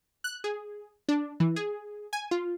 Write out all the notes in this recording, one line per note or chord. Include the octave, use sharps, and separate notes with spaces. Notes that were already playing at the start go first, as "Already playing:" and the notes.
F#6
G#4
D4
E3
G#4
G#5
F4